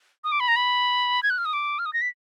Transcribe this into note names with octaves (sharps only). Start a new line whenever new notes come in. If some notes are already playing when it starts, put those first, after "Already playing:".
D#6
D6
B5
A#5
B5
G#6
F#6
F6
D#6
D6
F6
D#6
A#6
B6